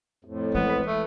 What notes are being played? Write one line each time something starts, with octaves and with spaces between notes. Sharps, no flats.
F2 A2
E3 G#3 B3
B4
A3